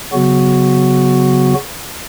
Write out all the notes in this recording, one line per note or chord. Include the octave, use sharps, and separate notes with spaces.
C#3 F#3 B3 F#4